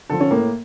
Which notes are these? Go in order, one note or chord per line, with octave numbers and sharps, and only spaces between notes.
D3 F3 A4
C#4
A2 A#3